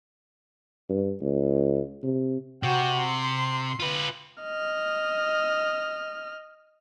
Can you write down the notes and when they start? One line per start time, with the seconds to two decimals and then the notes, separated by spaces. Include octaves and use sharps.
0.89 G2
1.21 C#2
2.04 C3
2.63 C3 F#4 G5
2.99 C6
3.80 F4 B4
4.43 D#5 F6